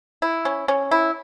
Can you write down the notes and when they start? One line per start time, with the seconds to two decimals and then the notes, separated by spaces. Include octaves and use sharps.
0.22 E4
0.45 C#4
0.68 C#4
0.91 E4